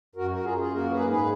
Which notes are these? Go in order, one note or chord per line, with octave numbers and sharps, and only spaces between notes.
F#2 F#4 A#4
F#4 A#4
F#2 F4 G#4
F4 G#4
A#3 F#4 A#4
G#4 B4
G#2
G#4 B4